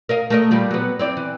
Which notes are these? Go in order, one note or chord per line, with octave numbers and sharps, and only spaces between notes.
A#4 D#5 F5
A3 A#4 D#5
A#2 G3 F4
F#3 B3
C4 E4 D5
E3